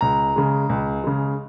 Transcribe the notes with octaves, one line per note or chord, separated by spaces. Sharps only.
C#2 A#5
C#3 G#3
C#2
C#3 G#3